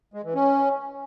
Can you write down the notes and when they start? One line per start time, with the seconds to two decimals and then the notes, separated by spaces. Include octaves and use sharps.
0.14 G#3
0.24 E3
0.35 C#4